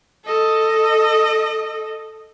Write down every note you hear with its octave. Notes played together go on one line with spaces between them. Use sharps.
A4 D#5